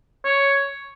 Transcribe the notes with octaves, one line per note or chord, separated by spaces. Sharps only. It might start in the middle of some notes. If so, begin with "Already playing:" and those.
C#5